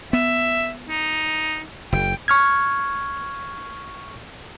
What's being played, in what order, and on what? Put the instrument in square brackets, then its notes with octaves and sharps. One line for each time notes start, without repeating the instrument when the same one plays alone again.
[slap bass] B3 [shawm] E5
[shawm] D#4
[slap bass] F#1 [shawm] G5
[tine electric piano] C#6 F6 G#6